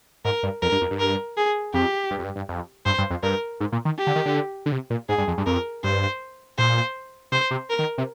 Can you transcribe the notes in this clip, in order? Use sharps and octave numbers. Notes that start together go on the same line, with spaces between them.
G#2 A#4
G2
F2 A#4
G2
F2
G2
A#4
G#4
F2 G4
G2
F2
G2
G2
F2
G2 C5
G2
F2
G2 A#4
G#2
A#2
D#3
G4
D3
D#3
D3
D3
C3
A#2
G#2 G#4
G2
F2
G2
F2 A#4
G2 C5
A#2 C5
C3 C5
C3
A#4
D#3
C3